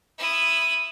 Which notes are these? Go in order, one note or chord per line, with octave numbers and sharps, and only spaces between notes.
E4 D#6